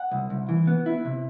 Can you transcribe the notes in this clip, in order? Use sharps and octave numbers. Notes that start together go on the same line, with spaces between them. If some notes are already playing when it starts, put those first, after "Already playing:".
Already playing: F#5
C2
C2
E3
B3
E4
C3